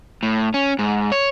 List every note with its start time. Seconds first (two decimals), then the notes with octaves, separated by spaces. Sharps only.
0.23 A2
0.54 C#4
0.79 G#2
1.12 C#5